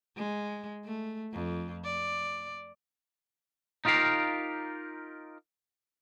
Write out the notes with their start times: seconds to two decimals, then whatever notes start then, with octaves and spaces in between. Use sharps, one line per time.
0.17 G#3
0.85 A3
1.33 F2
1.84 D5
3.85 D#4 F4 G4 A#4 F5